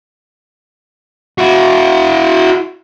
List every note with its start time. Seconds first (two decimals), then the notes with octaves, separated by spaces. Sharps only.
1.38 E4 F#4